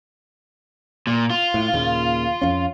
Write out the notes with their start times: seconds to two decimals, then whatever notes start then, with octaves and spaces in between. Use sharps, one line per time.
1.07 A#2
1.30 F4
1.54 A2
1.74 D#2 A#2 C#3
2.42 F2 C#4